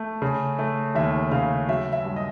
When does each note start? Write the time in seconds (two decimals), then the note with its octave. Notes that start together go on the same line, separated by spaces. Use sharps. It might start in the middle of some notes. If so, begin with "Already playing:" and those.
Already playing: A3
0.22 C#3
0.59 A3
0.95 D#2 E5
1.32 C#3 F5
1.69 F#3 E5
1.92 E5
2.05 G2
2.16 D#5